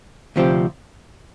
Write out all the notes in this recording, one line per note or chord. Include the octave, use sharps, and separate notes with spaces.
D2 C3 F3 C4 G4